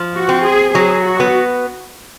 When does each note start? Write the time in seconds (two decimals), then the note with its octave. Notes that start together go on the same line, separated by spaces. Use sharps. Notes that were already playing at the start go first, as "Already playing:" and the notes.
Already playing: F3
0.14 F#4
0.29 C4
0.44 G#4
0.75 F#3 G#4
1.05 F#4
1.20 B3